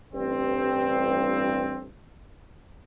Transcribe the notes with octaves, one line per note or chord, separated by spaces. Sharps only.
A1 G2 C4